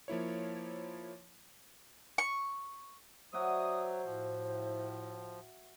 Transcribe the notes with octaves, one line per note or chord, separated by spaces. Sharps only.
F3 A#3 E4 C#5
C#6
F#3 F#4 C5 D5 E5 D#6
A2 F3